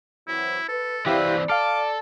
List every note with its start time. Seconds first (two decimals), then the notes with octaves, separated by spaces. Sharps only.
0.28 E3 F#3 C4 E4
0.69 A4 B4
1.06 E3 C4 E4 G4 B4 D5 F5
1.49 A4 F5 D6 F6